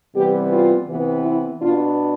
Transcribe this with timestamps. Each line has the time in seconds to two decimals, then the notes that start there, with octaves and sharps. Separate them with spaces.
0.15 C3 E3 G3 B3 G4
0.52 F4
0.89 C3 E3 B3
1.25 E4
1.61 B2 B3 D4 F4